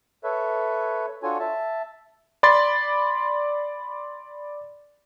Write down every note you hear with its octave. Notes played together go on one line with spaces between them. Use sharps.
A4 B4 C#5 E5
D4 F4 F#4 A4 C#5 G#5
E5 A5
D5 B5 C6 A6